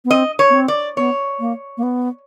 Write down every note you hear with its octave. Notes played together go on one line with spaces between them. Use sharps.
B3
C4 D#5
C#5
B3
C4
D5
B3 C#5
A#3
A#3
B3